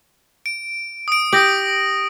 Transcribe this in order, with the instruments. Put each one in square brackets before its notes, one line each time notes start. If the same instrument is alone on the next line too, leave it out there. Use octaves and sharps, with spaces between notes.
[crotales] D7
D#6 D7
[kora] G4 [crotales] D#6 A#6 F#7